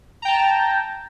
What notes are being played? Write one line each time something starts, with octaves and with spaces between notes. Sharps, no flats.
G5 A5 A#5